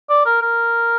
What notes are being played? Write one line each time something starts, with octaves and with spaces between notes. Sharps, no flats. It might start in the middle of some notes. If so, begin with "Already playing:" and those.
D5
A#4
A#4